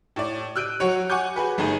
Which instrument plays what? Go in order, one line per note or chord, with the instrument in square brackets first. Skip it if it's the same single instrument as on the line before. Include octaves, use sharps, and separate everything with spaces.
[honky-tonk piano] A2 D5
E6 F#6 G6 D7 D#7
F#3 F#4 C#5
F#5 G#5 C#6 D6 G6
F#4 G#4 B4
G1 A3 D#4 G#4 D#7